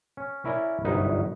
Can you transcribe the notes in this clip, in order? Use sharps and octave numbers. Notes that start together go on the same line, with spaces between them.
C#4
C#4 E4 A#4 D5
G1 C2 F#2 D#4 B4 C#5